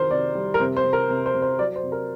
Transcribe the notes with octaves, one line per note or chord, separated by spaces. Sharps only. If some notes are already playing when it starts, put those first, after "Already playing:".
Already playing: C3 D#3 F#3 A#4 C5
C3 D5
G3
A#4
C3 C5
C5
C3
A#4
C3
C5
C3
C5
F#3 D5
C5
C3
A#4